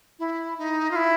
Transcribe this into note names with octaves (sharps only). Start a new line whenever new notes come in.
E4
D#4
F4
E4